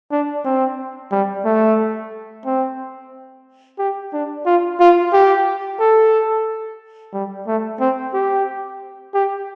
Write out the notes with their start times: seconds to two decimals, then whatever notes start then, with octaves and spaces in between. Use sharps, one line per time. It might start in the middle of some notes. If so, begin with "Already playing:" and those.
0.12 D4
0.45 C4
1.12 G3
1.45 A3
2.46 C4
3.79 G4
4.13 D4
4.46 F4
4.80 F4
5.13 G4
5.80 A4
7.13 G3
7.47 A3
7.80 C4
8.14 G4
9.14 G4